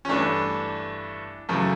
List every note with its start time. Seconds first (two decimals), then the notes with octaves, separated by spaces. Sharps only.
0.05 C#4
0.09 G2 E3 A3 D4
1.49 F#2 C#3 E3 A3